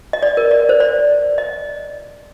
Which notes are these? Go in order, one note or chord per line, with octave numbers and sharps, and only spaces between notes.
D#5
D5
A#4
D5
C5
D5
D#5